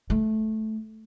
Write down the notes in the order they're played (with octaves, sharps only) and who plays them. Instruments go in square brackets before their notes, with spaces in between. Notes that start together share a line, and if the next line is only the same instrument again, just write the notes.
[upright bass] A3